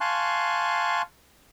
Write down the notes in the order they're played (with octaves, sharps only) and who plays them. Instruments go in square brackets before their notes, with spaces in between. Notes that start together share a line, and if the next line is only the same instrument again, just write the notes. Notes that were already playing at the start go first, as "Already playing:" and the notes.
[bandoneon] F5 G#5 A5 C6 C#6 F#6